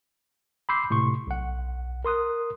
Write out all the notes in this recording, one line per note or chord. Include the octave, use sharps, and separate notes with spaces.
B5 C6 D6 E6 G6 C7
A2 C3 C6 C#6
B1 F#5
A#4 C6 D#6 F#6